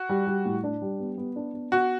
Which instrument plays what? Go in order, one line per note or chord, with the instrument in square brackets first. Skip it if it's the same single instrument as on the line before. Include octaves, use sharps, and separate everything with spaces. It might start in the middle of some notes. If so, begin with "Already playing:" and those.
Already playing: [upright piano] F#4
[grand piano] G3
G3
A2
D4
G3
B3
B3
D4
B3
[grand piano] B3 [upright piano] F#4